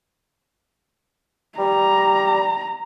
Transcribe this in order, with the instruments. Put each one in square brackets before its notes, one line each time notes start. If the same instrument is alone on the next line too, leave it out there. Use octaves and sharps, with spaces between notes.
[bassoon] G3 [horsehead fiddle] A#5